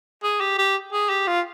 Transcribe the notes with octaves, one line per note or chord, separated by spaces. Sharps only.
G#4
G4
G4
G#4
G4
F4